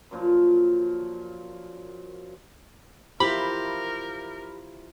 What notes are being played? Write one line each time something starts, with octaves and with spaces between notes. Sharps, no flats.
F#2 A#2 F3
E4 F4 G4 A#4 C5 B5